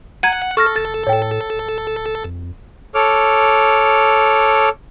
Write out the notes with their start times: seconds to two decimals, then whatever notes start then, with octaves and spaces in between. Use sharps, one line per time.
0.23 F#5 A#5 G#6 D#7
0.57 A4 C#6 F6 A#6
0.76 F1 A6
1.07 A2 C#5 G5
1.55 D1
2.24 F2
2.95 A4 C#5 D6 F6